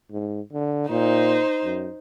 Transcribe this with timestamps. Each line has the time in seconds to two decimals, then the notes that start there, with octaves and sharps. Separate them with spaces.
0.12 G#2
0.53 D3
0.90 A#2 D#4 C5
1.64 F#2